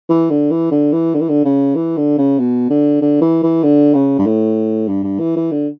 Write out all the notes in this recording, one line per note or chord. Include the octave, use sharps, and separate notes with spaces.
E3
D3
E3
D3
E3
D3
E3
D3
C#3
E3
D3
C#3
B2
D3
D3
E3
E3
D3
C#3
G2
A2
G2
G2
E3
E3
D3